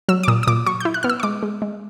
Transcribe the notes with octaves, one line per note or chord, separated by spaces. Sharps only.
F#3 E6
D6
A#2 D#6
D#6
A#2 D6
F#3 C#6
E4 G6
F#6
B3 F6
E6
C#6
G#3 D6
G#3
G#3